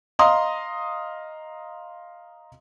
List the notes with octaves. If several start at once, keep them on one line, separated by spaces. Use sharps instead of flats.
D#5 F5 A#5 C6 D#6